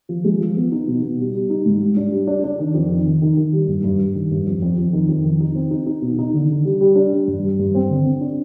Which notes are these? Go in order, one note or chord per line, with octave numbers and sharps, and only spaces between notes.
F3
G#3
F3
B3
D#4
B2
B2
G3
G3
D#4
G#2
G3
D4
G3
D4
D4
D#3
F2
D#3
D#3
D#3
D#3
G3
G2
G2
G3
D#3
G2
F2
F2
F2
D#3
F2
D#3
D#4
C4
D#4
D#4
B2
D#4
D3
D3
G3
G3
D4
G3
G2
G3
G2
C4
D3
C4
D4